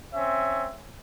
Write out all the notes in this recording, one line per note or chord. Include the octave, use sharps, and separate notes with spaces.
C4 C#4 E5